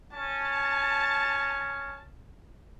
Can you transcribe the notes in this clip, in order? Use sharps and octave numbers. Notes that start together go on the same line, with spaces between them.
C#4 A5